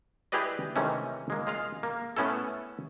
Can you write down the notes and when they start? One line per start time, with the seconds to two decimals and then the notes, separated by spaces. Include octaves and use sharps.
0.32 E4 G4 G#4 B4 D5 D#5
0.76 C3 D#3 E3 G#3 A3 C#4
1.30 G#3 A#3
1.47 G#3 F4 F5
1.83 A#3
2.17 A3 B3 C#4 E4 A4